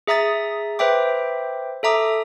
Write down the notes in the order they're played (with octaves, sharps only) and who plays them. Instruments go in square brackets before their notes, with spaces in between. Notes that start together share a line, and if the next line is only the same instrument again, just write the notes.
[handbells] G#4 E5 A#5 D#6 A6
B4 C5 E5 G5 D6
A4 E5 A#5 D6 D#6